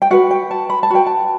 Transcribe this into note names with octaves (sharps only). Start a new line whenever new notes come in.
G5
F#4 B4 F#5
G5
A5
B5
A5
F#4 B4 G5
A5